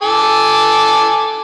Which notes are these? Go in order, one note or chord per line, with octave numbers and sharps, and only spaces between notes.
A4 G#5 D6